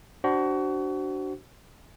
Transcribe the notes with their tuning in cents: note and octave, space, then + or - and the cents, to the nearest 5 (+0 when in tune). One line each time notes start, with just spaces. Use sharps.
D4 +0 F#4 +30 C5 +0